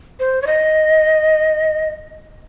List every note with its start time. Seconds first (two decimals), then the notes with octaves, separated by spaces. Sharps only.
0.19 C5
0.42 C#5
0.47 D#5